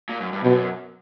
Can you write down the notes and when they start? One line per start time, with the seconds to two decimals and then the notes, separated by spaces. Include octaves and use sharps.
0.09 A#2
0.20 F#2
0.33 G2
0.43 F#2 B2